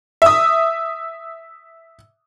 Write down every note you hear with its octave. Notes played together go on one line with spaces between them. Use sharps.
E5 D#6